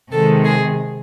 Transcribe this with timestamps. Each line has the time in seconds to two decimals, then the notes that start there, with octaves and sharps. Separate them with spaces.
0.11 C3 D#3 G#3 A4
0.45 G#4